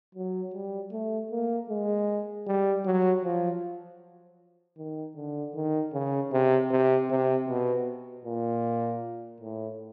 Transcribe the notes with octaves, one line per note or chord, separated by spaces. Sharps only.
F#3
G3
A3
A#3
G#3
G3
F#3
F3
D#3
D3
D#3
C#3
C3
C3
C3
B2
A#2
A2